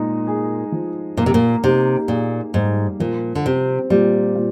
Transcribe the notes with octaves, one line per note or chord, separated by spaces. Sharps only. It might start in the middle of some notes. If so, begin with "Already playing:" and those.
Already playing: A#2 G#3 D#4
G#4
F3
A#2 A#3
C3
A#2
C3 D#4
A#2 G#4
G#2 G3
A#2 F3
D3
C3 C4
A#2 G3
A#2